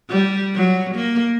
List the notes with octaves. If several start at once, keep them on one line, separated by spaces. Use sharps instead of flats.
G3
F#3
A#3